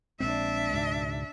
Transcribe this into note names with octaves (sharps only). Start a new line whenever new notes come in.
A#1 G#3 C4 D4 E5
C#2 G#2 B2